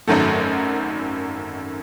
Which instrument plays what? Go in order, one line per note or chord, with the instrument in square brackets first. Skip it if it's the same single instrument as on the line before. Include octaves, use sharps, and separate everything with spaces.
[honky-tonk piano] G#1 F#2 D#3 F#3 A3